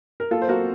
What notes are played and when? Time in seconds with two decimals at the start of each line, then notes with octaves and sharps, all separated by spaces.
0.20 A#4
0.31 A#3 F4 A4
0.42 C5
0.49 A#3 F#4 A#4